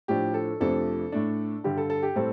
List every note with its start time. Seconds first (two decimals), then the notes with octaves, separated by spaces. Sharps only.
0.08 A2 F3 D4 G4
0.34 A4
0.60 F2 C3 F3 A3 D4 A4
1.12 A2 A3 D4
1.64 G2 D3 G3 G4
1.77 A4
1.90 A4
2.03 G4
2.16 A2 G3 C4 A4